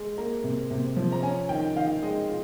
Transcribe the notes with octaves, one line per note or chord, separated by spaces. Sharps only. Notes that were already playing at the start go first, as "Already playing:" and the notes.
Already playing: G#3
A#3 A#5
C3
C3
F3
A#5
C#4 G#5
D#3 G5
D#3 F5
G#3 D#5
F4